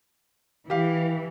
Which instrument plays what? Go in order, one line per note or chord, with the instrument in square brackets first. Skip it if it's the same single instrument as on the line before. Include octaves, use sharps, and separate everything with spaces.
[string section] E3 [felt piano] G4 F5